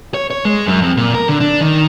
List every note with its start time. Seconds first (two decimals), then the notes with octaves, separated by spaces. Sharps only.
0.14 C#5
0.31 C#5
0.45 G#3
0.67 F#2
0.82 F2
0.97 A#2
1.15 A#4
1.29 D3
1.40 D4
1.61 D#3